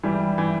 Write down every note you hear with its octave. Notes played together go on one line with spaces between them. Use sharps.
E3 G3
E3